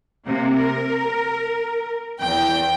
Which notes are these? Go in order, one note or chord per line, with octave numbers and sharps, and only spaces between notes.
C3 A#3
A#4
E2 G5